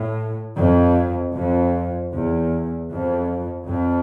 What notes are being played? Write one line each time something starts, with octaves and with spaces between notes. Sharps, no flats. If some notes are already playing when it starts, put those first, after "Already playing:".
Already playing: A2
F2
F2
E2
F2
F2